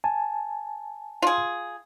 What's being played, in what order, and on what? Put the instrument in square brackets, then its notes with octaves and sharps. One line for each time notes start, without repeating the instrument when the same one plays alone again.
[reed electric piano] G#5 A5
[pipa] F4 G#4